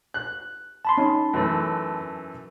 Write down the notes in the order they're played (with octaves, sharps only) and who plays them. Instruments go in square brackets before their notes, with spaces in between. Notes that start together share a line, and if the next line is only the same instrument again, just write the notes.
[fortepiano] F#6
[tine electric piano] A5 B5 C6
[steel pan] C#4 D#4
[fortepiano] F#2 E3 A3